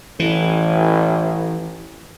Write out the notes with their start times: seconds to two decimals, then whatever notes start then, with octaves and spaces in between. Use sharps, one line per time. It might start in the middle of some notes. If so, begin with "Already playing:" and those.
0.20 A1 E3